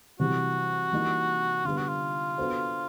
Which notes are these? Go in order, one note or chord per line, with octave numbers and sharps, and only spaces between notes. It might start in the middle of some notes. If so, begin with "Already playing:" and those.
C3 E3 G3 F#4
E3 G3 A#3 D#4
D3 G3 B3 F4
F#4
F4
B3 D4 F#4 A4 C5